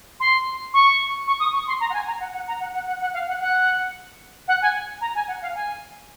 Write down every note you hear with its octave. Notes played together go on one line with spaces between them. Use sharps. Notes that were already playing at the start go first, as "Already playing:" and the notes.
C6
C#6
C#6
D#6
C#6
C6
A#5
F#5
G#5
A#5
F#5
F#5
A#5
F#5
F#5
F#5
F#5
F5
F#5
F#5
F#5
G#5
A#5
G#5
F#5
F5
G#5